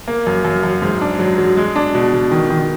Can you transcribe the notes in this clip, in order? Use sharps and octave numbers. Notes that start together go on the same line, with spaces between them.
A#3
F#2
F#2
F#2
G#2
D4
F#3
F#3
G#3
D4
B2
B2
D#3
D#3